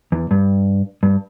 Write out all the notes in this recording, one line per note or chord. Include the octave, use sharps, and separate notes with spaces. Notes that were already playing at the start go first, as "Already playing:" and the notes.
E2
G2
G2